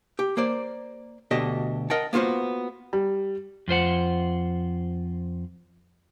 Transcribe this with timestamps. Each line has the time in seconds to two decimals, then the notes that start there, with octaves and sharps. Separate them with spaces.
0.19 G4
0.37 A#3 C5 D5
1.31 D2 B2 D4 G4 A4 D#5
1.90 A#4 D#5 F#5 G5 A5
2.13 A#3 B3 F4 F#4 C5
2.93 G3
3.68 F2 F4 C5 F#5